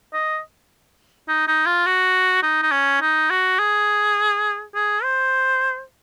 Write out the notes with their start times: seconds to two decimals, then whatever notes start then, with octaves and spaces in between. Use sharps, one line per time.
0.13 D#5
1.29 D#4
1.48 D#4
1.66 F4
1.86 F#4
2.43 D#4
2.63 D#4
2.72 C#4
3.02 D#4
3.30 F#4
3.59 G#4
4.74 G#4
5.04 C5